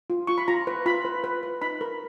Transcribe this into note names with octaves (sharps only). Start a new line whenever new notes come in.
F4
F4 C#6
B5
F4 A#5
B4
F4 B5
B4
B4
B4
D#4 B5
A#4